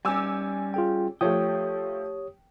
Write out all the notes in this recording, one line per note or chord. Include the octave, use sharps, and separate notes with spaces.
G3 C#4 G#5 D6 E6
F4 G#4 G5
F3 A3 G4 C#5 G5 D#6